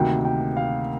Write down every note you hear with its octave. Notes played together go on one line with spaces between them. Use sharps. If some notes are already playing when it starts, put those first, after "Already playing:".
Already playing: D2 C3 D#3 A#3 G5
G5
F5